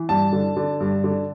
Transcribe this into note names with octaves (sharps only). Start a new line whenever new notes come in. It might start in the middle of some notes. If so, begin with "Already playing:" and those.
Already playing: E3
G2 A5
D3
D3
G2
D3